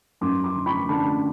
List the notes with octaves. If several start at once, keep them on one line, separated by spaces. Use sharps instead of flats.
F#2 C6 D6
C6 D6
D3
B5 C#6
D3 A5 B5